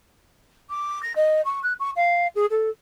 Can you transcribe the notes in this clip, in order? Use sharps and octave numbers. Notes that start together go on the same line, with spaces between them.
D6
A#6
D#5
C#6
F#6
C#6
F5
G#4
A4